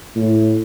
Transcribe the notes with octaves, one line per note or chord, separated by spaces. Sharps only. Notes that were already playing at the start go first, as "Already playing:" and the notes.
A2